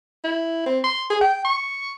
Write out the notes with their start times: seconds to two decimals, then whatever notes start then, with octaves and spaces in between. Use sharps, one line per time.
0.24 E4
0.66 C4
0.84 C6
1.10 G#4
1.21 G5
1.45 C#6